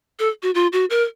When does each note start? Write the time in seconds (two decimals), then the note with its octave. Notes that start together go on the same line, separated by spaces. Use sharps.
0.19 A4
0.43 F#4
0.55 F4
0.73 F#4
0.90 A#4